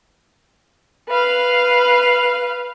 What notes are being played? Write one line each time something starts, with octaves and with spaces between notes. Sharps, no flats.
B4 F5